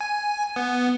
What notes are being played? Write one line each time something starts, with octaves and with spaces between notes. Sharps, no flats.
G#5
B3